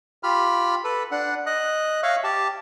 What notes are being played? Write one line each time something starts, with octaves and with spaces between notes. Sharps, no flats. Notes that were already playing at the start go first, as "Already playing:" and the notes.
F4 G4 B5 F6
A4 B4
D4 F#5
D#5 F#6
C#5 E5 F5 C#6
G4 A5